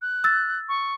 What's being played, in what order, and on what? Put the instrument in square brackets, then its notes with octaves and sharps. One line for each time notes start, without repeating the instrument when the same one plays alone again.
[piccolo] F#6
[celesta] E6 A6
[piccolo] C#6